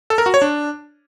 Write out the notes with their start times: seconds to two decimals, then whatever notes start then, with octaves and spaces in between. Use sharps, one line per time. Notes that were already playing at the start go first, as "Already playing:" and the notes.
0.10 A4
0.18 A#4
0.26 F#4
0.34 C#5
0.42 D4